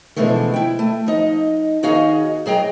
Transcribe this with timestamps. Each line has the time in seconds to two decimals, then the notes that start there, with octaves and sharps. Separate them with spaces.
0.16 B2 D3 E3 F3 G#3 A3
0.54 E4 G5
0.79 A3
1.07 F3 D#4 D#5
1.83 D#2 D#4 F#4 G#4 D#5 F5
2.46 F#3 G#4 D#5 G5 A#5